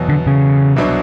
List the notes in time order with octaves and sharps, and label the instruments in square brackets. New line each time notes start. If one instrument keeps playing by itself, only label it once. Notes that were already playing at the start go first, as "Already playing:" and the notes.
Already playing: [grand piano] E2 B2 F#3 B3
[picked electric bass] D3
C#3
[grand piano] C2 B2 F#3 B3 D4